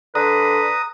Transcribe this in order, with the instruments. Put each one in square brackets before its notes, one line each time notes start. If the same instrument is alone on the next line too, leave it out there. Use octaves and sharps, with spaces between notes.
[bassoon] D3 [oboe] B4 [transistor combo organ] A#5 D#6